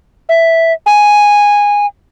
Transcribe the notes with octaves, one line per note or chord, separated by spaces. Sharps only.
E5
G#5